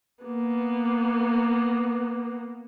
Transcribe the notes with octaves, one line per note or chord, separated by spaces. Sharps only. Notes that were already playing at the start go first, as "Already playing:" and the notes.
A#3 B3